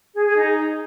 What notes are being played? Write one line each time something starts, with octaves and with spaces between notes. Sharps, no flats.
G#4
G#4
D#4